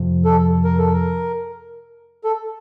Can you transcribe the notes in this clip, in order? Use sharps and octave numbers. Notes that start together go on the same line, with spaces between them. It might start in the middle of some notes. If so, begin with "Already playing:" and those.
Already playing: F2 C3 F3
A4
A#4
A4
A#4
A4